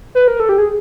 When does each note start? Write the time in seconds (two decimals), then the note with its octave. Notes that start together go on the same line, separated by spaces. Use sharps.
0.15 B4
0.28 A#4
0.40 A4
0.49 G4
0.58 G#4